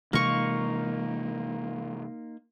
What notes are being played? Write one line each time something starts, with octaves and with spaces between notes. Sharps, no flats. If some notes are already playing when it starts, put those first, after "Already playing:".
C3 E3 G#3 A#3 D#4 F4 A#4 C#6